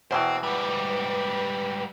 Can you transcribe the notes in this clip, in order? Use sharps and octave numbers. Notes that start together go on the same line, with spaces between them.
E2 B2 E3 C5 G5
G#2 G3 B4